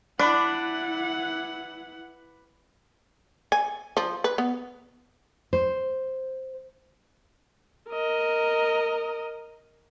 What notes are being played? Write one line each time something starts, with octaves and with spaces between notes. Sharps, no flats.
D4 E4 B4 F#5 D6
G#5
F3
B4
B3
C5
A#4 D#5